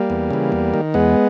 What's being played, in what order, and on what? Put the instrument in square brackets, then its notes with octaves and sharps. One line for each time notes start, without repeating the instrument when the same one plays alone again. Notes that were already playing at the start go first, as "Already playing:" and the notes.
Already playing: [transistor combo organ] G3 A#3
E2
C#3 E3
E2
D#3
E2 G#3 B3